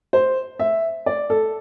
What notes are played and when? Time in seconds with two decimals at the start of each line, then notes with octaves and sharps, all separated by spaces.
0.13 C5
0.60 E5
1.06 D5
1.30 A4